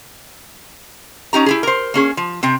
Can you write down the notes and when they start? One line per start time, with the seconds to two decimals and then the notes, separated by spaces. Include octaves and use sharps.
1.33 C#4 D#4 G4 A#5
1.46 E4 G4 G#4
1.63 A#4 C5
1.94 A#3 C#4 G#4
2.17 F3
2.43 C3 C4 G5